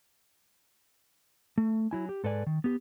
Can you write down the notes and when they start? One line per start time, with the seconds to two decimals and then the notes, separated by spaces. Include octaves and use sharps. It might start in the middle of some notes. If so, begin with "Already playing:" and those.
1.58 A3
1.91 F#3 E4 G#5
2.09 G4
2.24 G#2 A4 B4 D5 G#5
2.47 D#3
2.64 B3 G4